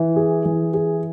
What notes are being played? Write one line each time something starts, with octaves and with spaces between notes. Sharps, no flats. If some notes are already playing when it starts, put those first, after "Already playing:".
Already playing: E3
G#4
E3
G#4